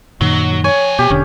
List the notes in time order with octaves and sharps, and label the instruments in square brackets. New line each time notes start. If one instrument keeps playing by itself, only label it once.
[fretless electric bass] F#2 A#2 D#3 [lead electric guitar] F#3
[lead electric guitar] F3 G#5 [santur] C#5
[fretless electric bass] B2 [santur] G4
[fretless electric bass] E1 D3 [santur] C#4